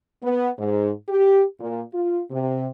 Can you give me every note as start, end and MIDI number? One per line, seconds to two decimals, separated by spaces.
0.23 0.50 59
0.58 0.91 44
1.09 1.44 67
1.60 1.82 46
1.93 2.21 65
2.31 2.68 48